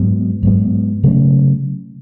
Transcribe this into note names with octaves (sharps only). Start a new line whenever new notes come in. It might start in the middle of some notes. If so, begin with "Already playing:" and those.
Already playing: G#2 F#3 B3
G#2 F#3 B3
C#3 F#3 A3 C#4